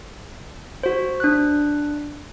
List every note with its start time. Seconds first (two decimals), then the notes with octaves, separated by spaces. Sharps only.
0.83 F#4 C5
1.20 D4 F#6